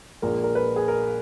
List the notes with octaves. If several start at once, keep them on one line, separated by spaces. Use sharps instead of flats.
A#1 A#2 G#3 A#4
A#4
B4
G#4
A#4